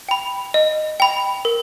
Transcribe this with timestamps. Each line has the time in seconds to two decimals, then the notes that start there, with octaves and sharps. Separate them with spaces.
0.09 G5 B5
0.54 D#5
1.00 G5 B5
1.45 A#4